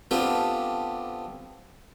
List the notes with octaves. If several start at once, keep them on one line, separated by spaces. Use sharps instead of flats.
A3 B3 C4 D4 F4 G4